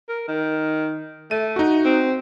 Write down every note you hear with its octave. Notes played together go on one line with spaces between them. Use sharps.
A#4
D#3
A3 D#7
D#4 F#4
C4